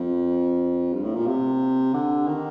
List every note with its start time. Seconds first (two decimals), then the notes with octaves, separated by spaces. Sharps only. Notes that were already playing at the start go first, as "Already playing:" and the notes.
Already playing: F2
0.93 G2
1.04 A2
1.15 A#2
1.27 C3
1.94 D3
2.27 D#3